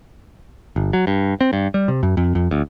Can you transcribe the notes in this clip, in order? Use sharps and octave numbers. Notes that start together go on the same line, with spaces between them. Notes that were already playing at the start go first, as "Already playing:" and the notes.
G1
F#3
G2
C4
G2
G3
C3
F#2
F2
F2
D2